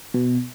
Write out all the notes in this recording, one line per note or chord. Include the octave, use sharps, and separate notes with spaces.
B2